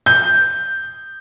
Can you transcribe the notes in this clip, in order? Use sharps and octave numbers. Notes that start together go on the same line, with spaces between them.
G6